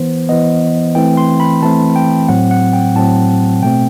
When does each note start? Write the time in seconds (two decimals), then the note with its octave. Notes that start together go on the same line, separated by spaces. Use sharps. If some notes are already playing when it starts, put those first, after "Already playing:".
Already playing: E3 B3 C5
0.29 E3 B3 D#5
0.95 E3 A3 C4 G5
1.17 C6
1.40 B5
1.62 E3 A3 C4 A5
1.96 G5
2.28 A2 F#3 C4 F#5
2.51 F#5
2.73 G5
2.96 A2 F#3 C4 A5
3.62 B2 A3 C4 G5